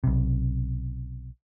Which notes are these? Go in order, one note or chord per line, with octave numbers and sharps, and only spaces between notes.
B1 C3